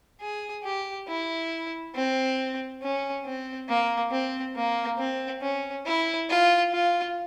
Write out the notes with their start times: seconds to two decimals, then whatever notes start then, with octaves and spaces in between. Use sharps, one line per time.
0.21 G#4
0.64 G4
1.08 E4
1.95 C4
2.82 C#4
3.25 C4
3.69 A#3
4.11 C4
4.55 A#3
4.98 C4
5.42 C#4
5.86 E4
6.29 F4
6.72 F4